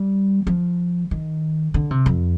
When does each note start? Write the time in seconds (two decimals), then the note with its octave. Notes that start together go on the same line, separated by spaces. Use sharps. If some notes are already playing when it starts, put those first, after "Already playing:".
Already playing: G3
0.47 F3
1.11 D#3
1.74 D3
1.91 C3
2.06 F2